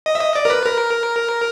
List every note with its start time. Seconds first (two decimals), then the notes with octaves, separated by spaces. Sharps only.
0.06 D#5
0.15 E5
0.21 D#5
0.35 D5
0.45 A#4
0.50 B4
0.65 A#4